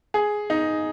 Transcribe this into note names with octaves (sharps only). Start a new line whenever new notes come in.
G#4
D#4